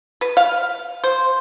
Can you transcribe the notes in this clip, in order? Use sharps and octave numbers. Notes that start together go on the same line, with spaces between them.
B4
F5
C5